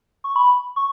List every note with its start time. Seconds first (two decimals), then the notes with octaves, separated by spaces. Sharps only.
0.24 C#6
0.36 B5
0.76 C#6